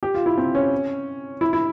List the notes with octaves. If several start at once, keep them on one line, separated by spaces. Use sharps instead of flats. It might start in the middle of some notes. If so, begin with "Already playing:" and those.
G4
F4
E4
C4
C#4
E4
E4